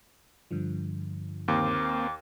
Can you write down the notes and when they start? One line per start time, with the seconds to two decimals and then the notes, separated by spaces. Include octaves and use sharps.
0.51 G2 D3 F3
1.48 D#2 A#3 C4 D6